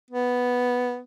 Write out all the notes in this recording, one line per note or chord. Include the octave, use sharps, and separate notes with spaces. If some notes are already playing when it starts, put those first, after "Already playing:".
B3